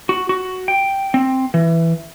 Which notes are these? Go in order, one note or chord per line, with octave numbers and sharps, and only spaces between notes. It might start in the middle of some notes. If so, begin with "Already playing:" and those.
F#4
F#4
G5
C4
E3